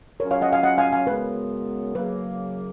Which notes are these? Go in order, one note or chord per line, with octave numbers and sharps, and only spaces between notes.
C#3 F#3 C#4 F4 A#4 C#5
C#5 F5
D#5 F#5
F5 G#5
D#5 F#5
F5 G#5
F5 G#5
F#2 C#3 G#3 B3 B4
F#2 C#3 F#3 A#3 B4